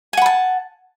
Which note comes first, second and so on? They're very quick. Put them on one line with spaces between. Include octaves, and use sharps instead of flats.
G#5 F#5 B5 A5